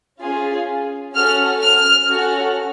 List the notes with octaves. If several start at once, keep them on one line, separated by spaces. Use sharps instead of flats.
C#4 F4 G#4
C#4 F#4 A4 F6
F6
C#4 F#4 A4